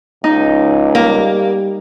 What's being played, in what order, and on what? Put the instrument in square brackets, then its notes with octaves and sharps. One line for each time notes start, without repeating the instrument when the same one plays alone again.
[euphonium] C#2 [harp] D#4
[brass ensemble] G3 [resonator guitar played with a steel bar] A#3